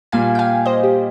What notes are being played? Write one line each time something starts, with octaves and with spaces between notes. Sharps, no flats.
A#2 G3 A#3 F5 G#5
G5
F5 G#5
C5 D#5
G4